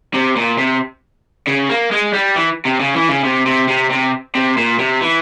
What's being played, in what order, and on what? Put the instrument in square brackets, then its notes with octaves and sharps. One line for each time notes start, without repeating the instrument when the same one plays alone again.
[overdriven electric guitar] C3
A#2
C3
C#3
A#3
G#3
G3
E3
C3
C#3
E3
C#3
C3
C3
C3
C3
C3
A#2
C3
E3